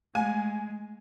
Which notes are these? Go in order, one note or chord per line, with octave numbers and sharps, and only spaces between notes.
G#3 A3 G#5